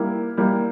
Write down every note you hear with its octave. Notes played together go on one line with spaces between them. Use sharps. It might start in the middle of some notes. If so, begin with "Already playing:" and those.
Already playing: G3 A#3 E4
G3 A#3 E4